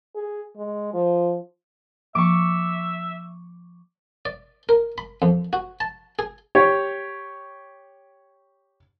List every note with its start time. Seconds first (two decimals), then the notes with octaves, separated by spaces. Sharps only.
0.15 G#4
0.56 G#3
0.93 F3
2.15 F3 A#3 E5 C#6 D6
4.25 D5
4.69 A#4
4.98 B5
5.22 F2
5.53 F#4
5.80 A5
6.19 G#4
6.55 G4 C#5